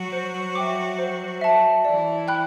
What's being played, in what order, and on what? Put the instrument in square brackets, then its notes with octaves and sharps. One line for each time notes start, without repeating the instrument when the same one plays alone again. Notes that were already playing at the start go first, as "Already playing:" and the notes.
Already playing: [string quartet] F#3 F#4
[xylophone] C5
E5 G5 D6
C5
E5 A5
[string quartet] E3 E4 [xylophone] D5
[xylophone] G5 B5 F#6